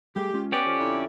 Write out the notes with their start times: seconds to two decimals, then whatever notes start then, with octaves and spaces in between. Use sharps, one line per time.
0.16 G3 A3 G4 G#4
0.34 G#3 C#4 F4
0.52 B3 C#4 G4 D5 G5
0.66 F3 A4
0.79 F2 D3 E4